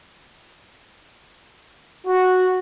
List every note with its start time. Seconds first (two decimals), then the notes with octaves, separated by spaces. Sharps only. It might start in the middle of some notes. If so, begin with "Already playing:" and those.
2.07 F#4